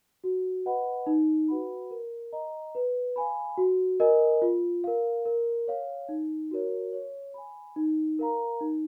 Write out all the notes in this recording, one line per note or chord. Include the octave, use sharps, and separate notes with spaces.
F#4
B4 D#5 F#5 B5
D#4
F#4 B4 F#5 B5
A#4
D#5 A#5
B4
F5 G#5 B5
F#4
A#4 D#5 G#5
F4
A#4 F5
A#4
C#5 F5
D#4
F#4 A#4 C#5
C#5
G#5 B5
D#4
A#4 F5 A#5
D#4